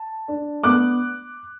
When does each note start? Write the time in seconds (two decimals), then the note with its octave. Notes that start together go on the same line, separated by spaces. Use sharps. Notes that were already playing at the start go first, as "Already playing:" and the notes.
Already playing: A5
0.28 D4
0.63 B3 D6 F#6